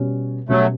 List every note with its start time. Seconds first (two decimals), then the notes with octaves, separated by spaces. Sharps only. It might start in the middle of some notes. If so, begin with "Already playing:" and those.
Already playing: B2 G3 C#4
0.49 B2 F#3 G3 A3 C#4